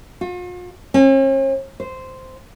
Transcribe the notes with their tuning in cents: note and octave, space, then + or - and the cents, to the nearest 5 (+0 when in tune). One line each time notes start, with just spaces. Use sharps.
F4 +45
C#4 -45
C5 -10